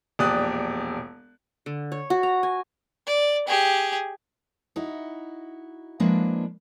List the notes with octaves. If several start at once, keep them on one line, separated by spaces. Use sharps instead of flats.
E1 A#1 G4 D5 D#6 F#6
D3
C#5
F#4
A#5
G#5
D5
G4 G#4
D#4 E4 F#4
F3 G#3 A#3 D4 E4 B4